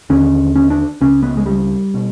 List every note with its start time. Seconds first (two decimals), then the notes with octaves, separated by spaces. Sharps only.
0.10 D#2 D3 C#4
0.55 C#4
0.70 D4
1.01 C#2 C#3 C#4
1.23 B3
1.37 G#3
1.46 G3
1.94 B2